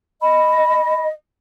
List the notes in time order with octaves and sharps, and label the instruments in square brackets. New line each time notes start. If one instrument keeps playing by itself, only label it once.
[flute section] D#5 [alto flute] B5